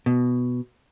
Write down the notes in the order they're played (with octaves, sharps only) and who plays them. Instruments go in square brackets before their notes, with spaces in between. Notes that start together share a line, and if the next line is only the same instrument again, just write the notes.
[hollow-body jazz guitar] B2